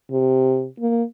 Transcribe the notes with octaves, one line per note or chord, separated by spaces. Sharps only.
C3
A#3